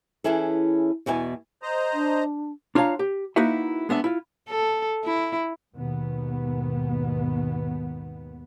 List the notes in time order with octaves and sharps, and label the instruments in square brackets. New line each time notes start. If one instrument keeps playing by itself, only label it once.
[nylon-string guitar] E3 C#4 E4 G#4 A4
E2 B2 E4 G5 G#5
[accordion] C5 D#5 A#5
[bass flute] D4
[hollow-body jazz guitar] D4 F4 C#5 D#5 F5 A#5
G4
A#3 D#4 E4 F#4 B4 E5
G#3 B3 D4 E5
E4 F4
[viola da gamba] A4
E4
[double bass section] D#2 G#2 B2 D#3 B3